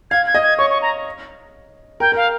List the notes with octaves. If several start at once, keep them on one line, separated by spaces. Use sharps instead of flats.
F5 G#6
G#6
D#5
G#6
C#5 C#6
C#6
A#5
A#4 G5
A#4
F5